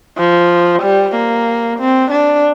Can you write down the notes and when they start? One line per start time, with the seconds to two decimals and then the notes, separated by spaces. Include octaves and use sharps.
0.17 F3
0.82 G3
1.15 A#3
1.79 C4
2.11 D4